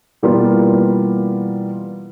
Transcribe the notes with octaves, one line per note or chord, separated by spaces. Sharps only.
B2 E3 G3 A#3 B3 F4